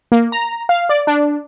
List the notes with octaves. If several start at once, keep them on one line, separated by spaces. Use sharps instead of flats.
A#3
A#5
F5
D5
D4